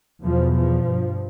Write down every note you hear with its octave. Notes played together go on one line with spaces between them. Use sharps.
E2 B2 F3
F3
G2